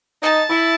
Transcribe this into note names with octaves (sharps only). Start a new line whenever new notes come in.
D#4 A5
E4